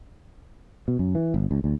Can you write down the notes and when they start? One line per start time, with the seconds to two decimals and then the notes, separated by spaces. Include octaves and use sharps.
0.88 B2
0.99 F#2
1.15 E3
1.34 G1
1.51 C#2
1.64 D2